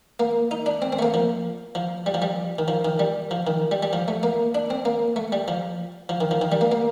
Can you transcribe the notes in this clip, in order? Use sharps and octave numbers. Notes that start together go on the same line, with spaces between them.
A#3
D#4
D4
C4
C4
A3
A#3
F3
F3
G3
F3
G3
D#3
F3
D#3
G3
F3
D#3
G3
G3
F3
A3
A#3
D4
C4
A#3
A3
G3
F3
F3
D#3
F3
D#3
G3
A#3
A#3